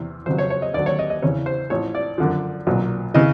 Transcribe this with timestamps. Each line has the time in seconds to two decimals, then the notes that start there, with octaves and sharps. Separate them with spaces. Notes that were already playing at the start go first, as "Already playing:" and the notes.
Already playing: E2 C3 E3
0.26 F2 C#3 F#3 C5
0.38 C#5
0.50 C#5
0.62 D#5
0.74 D#2 D3 F#3 D5
0.86 C#5
0.99 D#5
1.10 D#5
1.22 E2 C#3 E3 C#5
1.46 C5
1.70 A1 A2 F3 C#5
1.95 D5
2.18 F#2 D3 F3
2.67 B1 A#2 F#3
3.14 C#3 E3 D#5